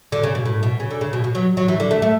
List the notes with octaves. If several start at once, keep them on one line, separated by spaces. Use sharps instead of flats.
D3
C#3
B2
A2
B2
C#3
D3
C#3
B2
B2
F#3
F#3
E3
D3
A3
A3